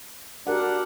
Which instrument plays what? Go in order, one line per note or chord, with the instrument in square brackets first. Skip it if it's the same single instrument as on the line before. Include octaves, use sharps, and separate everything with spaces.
[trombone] D4 [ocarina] F#4 [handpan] G4 A#4 F#5